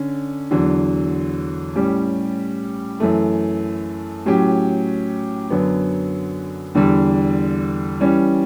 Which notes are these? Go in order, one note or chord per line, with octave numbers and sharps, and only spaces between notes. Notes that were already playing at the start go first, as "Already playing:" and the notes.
Already playing: D3 C#4
E2 D3 F#3
A2 G3 C#4 G4
F#2 E3 A3
A2 F#3 C#4 G4
F#2 D3 F#3 B3
E2 D3 G3
E3 G3 C#4